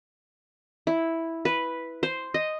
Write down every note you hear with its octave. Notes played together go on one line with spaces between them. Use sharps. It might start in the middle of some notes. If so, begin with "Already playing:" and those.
E4
B4
C5
D#5